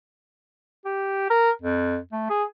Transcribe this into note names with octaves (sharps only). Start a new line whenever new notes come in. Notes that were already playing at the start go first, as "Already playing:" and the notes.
G4
A#4
F2
A3
G#4